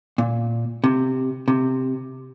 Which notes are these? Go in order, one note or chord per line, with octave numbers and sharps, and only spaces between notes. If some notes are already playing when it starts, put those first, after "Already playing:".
A#2
C3
C3